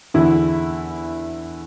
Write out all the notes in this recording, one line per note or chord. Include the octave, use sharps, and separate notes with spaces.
E2 D3 E4